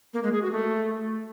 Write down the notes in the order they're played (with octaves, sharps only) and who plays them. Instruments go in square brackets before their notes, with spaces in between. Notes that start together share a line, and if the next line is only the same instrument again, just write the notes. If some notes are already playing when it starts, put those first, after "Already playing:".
[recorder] A#3
G#3
G#4
F#4
A3